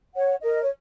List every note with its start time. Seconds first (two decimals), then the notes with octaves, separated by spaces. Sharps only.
0.16 C#5 F#5
0.43 A#4 D#5
0.63 C#5